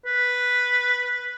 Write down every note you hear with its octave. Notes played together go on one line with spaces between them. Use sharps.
B4